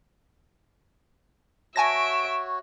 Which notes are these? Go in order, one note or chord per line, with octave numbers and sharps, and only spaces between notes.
F#4 C#5 E5 G#5 A5 A#6 D7